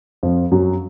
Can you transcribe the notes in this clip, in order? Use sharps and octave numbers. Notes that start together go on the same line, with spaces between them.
F2 F3
F#2 F#3